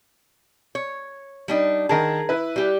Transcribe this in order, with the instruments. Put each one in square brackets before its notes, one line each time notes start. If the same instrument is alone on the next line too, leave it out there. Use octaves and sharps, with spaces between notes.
[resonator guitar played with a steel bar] C#5
G3 D4 D#4
[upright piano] D#3 A5 [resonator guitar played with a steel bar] G#4 A#4
[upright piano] E4 B4
[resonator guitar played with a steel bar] G3 G4